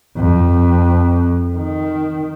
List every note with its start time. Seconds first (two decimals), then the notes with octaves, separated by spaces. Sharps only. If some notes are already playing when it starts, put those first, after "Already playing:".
0.17 F2
1.55 D#3